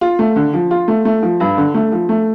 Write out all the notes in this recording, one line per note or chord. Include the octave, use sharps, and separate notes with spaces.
F4
A3
D3
F3
F4
A3
A3
F3
G2
D3
A3
F3
A3